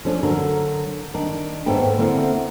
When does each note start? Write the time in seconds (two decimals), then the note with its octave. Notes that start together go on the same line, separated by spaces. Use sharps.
0.05 F3 A3 C#4 D4
0.23 D3 F#3 A#4
1.14 D#3 D4
1.66 D#2 G#2 A3 B3 A4 G5
1.98 D3 A#3 C4 E4 F#5